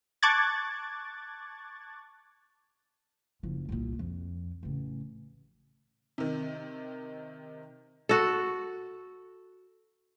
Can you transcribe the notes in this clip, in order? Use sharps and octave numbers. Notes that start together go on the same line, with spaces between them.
A5 C#6 D6 F#6 G#6 A6
F#1 F3
C2 A#2
F2
A1 C#3
C3 D#3
F#4 A4